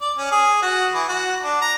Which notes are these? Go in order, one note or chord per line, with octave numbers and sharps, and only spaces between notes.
D5
C#4
G#4
F#4
E3
F#4
D4
A#5